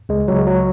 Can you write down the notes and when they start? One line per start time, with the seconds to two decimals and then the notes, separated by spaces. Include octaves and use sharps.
0.09 C#2 G#3
0.28 C#2 F#3
0.38 G#3
0.47 F#3